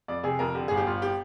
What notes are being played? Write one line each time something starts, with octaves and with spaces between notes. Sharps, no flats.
F2 D5
C3 G#4
F2 A#4
D3 G4
G1 G#4
G4
G1 F4
G4